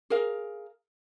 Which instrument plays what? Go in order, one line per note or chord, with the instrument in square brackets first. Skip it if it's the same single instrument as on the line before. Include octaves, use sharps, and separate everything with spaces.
[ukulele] G#4 A#4 F5